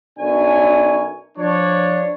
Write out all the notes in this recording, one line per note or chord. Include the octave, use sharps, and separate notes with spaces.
B1 F#2 D4 C#5 G#5
F3 D4 C#5